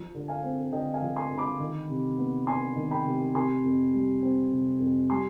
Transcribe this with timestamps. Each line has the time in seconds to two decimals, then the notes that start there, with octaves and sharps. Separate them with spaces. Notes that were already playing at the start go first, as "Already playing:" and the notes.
Already playing: F3
0.14 D3
0.28 F5 G#5
0.43 C4
0.72 D3 D#5 G5
0.94 F5 G#5
1.02 F3
1.16 G#5 C6
1.30 D3
1.38 B5 D6
1.59 D#3
1.89 C3
2.18 B3
2.47 D4 G#5 C6
2.76 D#3
2.91 G5 B5
3.05 C3
3.35 C3 G#5 C6
3.63 F2
3.93 G3
4.22 C4
4.51 C3
4.80 F2
5.10 G3 G#5 C6